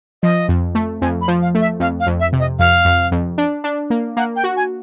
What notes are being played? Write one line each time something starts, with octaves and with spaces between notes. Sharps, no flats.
F3 D#5
F2
A3
F2 G#5
B5
F3
F5
A3
E5
F2 F5
F5
F2
E5
C3
D#5
F2 F5
F2
F2
D4
D4
A#3
A#3 F#5
G5
F#4
G#5